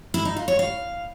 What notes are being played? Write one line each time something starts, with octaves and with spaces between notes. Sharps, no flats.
E4
D#4
F4
C#5
F5